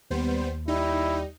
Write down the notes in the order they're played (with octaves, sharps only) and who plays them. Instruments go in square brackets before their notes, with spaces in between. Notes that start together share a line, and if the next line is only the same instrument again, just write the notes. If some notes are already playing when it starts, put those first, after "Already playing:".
[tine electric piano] D#2 [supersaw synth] G3 B3 C5
[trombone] G3 [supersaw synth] D#4 [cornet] E4